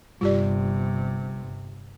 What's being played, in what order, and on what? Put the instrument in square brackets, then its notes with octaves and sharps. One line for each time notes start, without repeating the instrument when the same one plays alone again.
[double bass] G1 C3 [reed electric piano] G2 G3 [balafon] F4 G4 D5